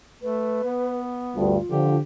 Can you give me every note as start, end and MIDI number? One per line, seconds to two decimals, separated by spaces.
0.22 0.63 57
0.22 1.01 71
0.64 1.58 59
1.35 1.57 38
1.35 1.57 43
1.35 1.95 65
1.71 1.97 50
1.71 1.97 53
1.71 1.99 67